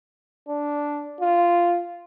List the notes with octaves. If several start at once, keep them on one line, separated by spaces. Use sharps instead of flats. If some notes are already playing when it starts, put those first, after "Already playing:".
D4
F4